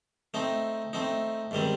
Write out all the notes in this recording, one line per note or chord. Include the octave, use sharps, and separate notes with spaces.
A3 C4 D#4
A3 C4 D#4
G#2 D#3 G3 C4